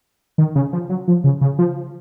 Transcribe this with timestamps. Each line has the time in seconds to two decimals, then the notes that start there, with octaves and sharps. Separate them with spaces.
0.38 D#3
0.56 C#3
0.73 F3
0.89 F#3
1.08 F3
1.24 C#3
1.41 C#3
1.59 F3